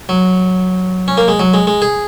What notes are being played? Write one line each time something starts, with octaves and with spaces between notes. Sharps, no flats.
F#3
C#4
A#3
G#3
F#3
G#3
G#3
G#4